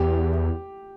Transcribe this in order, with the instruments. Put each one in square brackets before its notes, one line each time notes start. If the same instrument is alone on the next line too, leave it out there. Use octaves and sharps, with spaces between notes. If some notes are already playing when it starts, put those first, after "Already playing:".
Already playing: [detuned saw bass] E2 [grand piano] G4